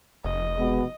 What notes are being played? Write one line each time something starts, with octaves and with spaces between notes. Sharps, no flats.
F1 D#5
B2 G#3 B3